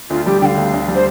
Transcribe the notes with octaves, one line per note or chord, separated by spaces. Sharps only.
D2 F4
G3 G4
D3 F5 G5
D2
D2
G3
C5